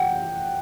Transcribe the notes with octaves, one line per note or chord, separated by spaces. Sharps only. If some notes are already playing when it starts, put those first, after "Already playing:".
Already playing: F#5 G5